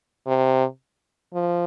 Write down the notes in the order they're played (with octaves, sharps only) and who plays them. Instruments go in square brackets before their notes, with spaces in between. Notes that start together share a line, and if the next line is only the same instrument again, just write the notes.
[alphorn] C3
F3